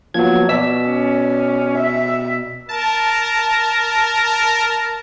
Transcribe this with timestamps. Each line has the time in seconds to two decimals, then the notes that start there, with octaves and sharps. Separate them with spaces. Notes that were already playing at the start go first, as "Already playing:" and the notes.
0.14 F3 F#3 A#3 B3 G#6
0.49 B2 D5 E6 B6
0.90 C#4
1.78 E5
2.69 A#4 A5